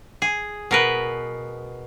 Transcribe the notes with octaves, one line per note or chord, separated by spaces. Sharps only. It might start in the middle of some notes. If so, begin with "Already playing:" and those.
G#4
B2 A#4 B4